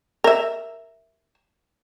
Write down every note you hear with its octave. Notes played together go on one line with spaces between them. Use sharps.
A#4 E5